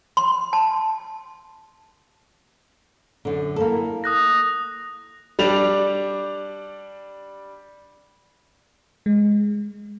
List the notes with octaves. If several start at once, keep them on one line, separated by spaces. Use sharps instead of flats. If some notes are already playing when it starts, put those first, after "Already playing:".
C6
A5
F#2 D3
A#3 E4 A4
D#6 F#6 A#6
G3 D4 F7
G#3